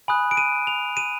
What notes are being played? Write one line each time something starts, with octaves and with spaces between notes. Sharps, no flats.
G#5 B5 D#6 F#6
D7
D#7
F7
D#7